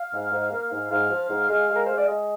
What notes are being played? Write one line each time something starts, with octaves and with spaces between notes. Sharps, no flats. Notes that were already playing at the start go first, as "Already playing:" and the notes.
Already playing: F5
G#2
G#2
A#3
G#2
G#2 F5
F3
G#2
G#3
G#3
A#4
G#3 C5
D5
G#3 D#5